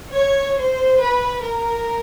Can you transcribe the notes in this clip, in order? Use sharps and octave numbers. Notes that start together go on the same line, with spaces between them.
C#5
C5
B4
A#4